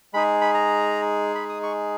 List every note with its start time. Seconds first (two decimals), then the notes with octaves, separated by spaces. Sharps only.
0.14 G#3 D#4 G#4 B5
0.41 B5
0.54 A#5
1.35 B5
1.49 D#6
1.63 C#6